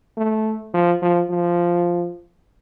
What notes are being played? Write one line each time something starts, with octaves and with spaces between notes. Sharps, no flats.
A3
F3
F3
F3